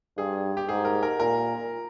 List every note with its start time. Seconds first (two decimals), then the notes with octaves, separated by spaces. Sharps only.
0.17 G2 G#4
0.57 G4
0.69 G#2 G#4
0.85 A#4
1.03 A#4
1.19 A#2 A#4